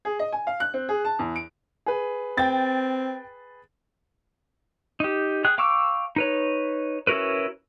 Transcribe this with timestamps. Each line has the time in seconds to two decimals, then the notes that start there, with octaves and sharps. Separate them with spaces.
0.05 G#4
0.19 D#5
0.32 G#5
0.47 F5
0.60 F#6
0.74 C4
0.89 G#4
1.05 A5
1.19 E2
1.36 D7
1.86 G#4 B4
2.38 C4 G5 A6
5.00 D#4 G4
5.45 G#4 G5 F#6
5.58 F5 G5 C#6 D6 E6
6.16 D#4 B4 C#5
7.07 C#4 E4 F#4 A#4 B4